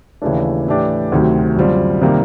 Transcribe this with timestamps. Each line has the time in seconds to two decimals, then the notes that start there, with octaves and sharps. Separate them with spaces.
0.22 D#2 C#3 E3 A3 D4
0.67 A2 E3 A3 D4 G4
1.12 D2 C3 D#3 F#3
1.56 F#2 D3 G3 C4 F4
2.02 C3 D#3 G3 A#3